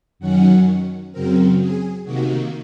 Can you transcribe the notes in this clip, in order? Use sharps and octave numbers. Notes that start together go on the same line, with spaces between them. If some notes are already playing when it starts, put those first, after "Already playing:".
F#2 D#3 F#3 C#4 F#5
F#2 C#3 F#3 C4 A#4
G#4
C3 D#3 A#3 F#4